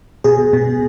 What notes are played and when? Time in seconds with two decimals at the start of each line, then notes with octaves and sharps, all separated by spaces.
0.24 B2 G#4
0.53 B2